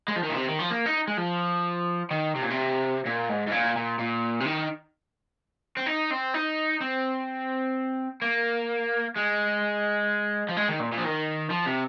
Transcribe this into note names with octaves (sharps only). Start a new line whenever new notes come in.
G#3
F3
D#3
A#2
C3
D#3
F3
A#3
D#4
G#3
F3
D#3
C3
A#2
C3
A#2
G#2
G#2
A#2
A#2
A#2
C3
D#3
C4
D#4
C4
D#4
C4
A#3
G#3
F3
G#3
D#3
A#2
A#2
F3
D#3
F3
C3